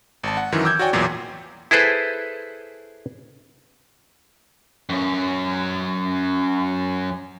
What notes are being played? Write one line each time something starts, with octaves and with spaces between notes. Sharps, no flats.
G#1 A5
F#5
F#2 D#3 E3
D6 E6 G6 G#6
F#4 C#5 D5 G5 G#5
A1 E2 A#2 F#3
E4 G#4 A4 B4 C5
F#2 C#4